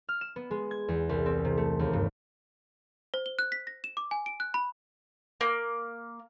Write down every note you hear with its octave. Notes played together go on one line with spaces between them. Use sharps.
F6
E7
B3
G#3
G#6
E2
C2
C4
C3
A3
D#2
G2
C5
G7
F#6
B6
A#6
E7
D6
G#5
D7
F#6
B5
A#3